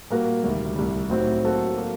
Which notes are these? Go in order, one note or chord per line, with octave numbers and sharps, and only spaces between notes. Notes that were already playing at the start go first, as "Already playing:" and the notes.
A#2 G3 A#3 F#4 A#4
D2 C3 D#3 G3
C2 C3 G3
A2 F#3 C4 D#4 F#4
F#3 A#3 F#4 A4 C5
F#3 A#3